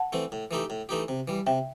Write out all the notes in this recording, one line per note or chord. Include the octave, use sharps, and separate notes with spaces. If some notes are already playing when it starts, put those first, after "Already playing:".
Already playing: F#5 A5
E3 A3 C4
A2
E3 A3 D#4 G4
A2
E3 A3 D#4 G4
C3
E3 G3
C3 E5 G5